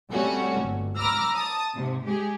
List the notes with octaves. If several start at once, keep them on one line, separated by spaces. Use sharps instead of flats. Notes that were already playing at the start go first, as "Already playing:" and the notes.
G3 A3 C4 C#4 F#4
G1
A#5 B5 D6 E6 F6 A#6
A5 D#6
G#2 C3
G#3 G4 G#4